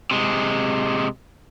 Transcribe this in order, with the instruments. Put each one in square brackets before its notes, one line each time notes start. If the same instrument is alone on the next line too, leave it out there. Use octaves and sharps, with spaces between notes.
[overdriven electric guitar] C3 G#3